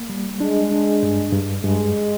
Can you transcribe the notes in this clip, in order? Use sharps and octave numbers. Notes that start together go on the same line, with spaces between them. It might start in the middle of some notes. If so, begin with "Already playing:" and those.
Already playing: A#3
G3
G#3 D4
D4
G2
G2
G2 G#3